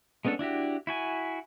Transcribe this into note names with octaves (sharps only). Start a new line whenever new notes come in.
G#3 B3 C#4 D4 A4
D4 E4 F#4 G4
E4 F#4 G#5